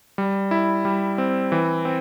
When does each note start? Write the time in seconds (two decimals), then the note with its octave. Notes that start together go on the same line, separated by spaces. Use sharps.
0.18 G3
0.51 E4
0.85 G3
1.18 C4
1.52 E3
1.85 C4